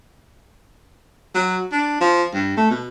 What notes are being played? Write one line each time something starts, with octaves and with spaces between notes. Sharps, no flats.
F#3
D4
F3
G2
A3
B2